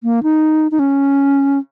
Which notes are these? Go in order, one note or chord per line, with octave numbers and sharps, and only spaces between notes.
A#3
D#4
D#4
C#4